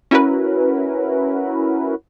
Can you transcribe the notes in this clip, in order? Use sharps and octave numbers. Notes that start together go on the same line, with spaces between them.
C#4 E4 F#4 A#4 B4